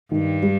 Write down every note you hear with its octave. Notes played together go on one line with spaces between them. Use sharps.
G2 D#3
G3